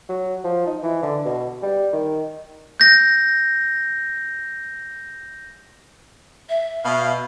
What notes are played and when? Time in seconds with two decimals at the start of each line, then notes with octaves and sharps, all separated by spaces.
0.09 F#3
0.44 F3
0.66 D#4
0.83 E3
1.03 D3
1.25 B2
1.62 G3
1.93 D#3
2.80 G6 A#6
6.49 E5
6.84 B2 F5